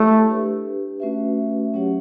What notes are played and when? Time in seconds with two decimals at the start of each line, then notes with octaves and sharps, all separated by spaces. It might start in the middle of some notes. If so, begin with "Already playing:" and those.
Already playing: A3 E4 G4 C#5
0.28 D4 G4 B4
1.00 A3 C#4 F#4 B4 E5
1.74 F#3 C#4 G4 C#5 F#5